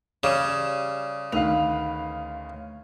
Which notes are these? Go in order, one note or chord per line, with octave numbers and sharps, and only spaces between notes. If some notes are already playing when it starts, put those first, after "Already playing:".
C#3 G3 D6 D#6 E7
D2 D#3 B4 F5 D#6 F7